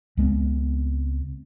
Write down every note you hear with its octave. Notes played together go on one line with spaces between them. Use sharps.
C#2 G#3 B3 C4